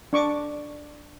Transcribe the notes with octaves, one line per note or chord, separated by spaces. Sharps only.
D4 C#6 D6